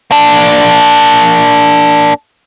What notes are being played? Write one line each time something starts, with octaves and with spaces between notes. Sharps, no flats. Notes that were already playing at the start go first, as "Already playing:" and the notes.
A#3 D4